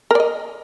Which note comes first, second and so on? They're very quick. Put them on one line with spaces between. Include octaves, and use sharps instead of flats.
A#4 D5 D#5